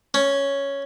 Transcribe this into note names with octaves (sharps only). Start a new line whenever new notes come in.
C#4